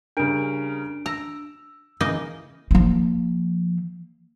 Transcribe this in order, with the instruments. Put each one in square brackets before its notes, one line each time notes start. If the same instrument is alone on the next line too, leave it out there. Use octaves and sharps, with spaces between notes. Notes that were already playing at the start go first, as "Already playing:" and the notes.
[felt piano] C#3 G3 A#4 [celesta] D4 D7
[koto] A#5 [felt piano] E6
[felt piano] C#3 E3 [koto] A#3 D#4 D#5
[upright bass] F3 A#3